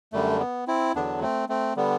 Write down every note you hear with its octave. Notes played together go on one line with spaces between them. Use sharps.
F#2 D3 G3 A3
B3
C4 E4
E2 D3 F#3 B3 D4
A3 C4
A3 C4
D3 G3 B3